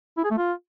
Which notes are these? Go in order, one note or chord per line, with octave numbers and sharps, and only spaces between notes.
E4
G#4
A3
F4